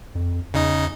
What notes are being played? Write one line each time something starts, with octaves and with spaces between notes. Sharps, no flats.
F2
E2 C#3 D#4 D#5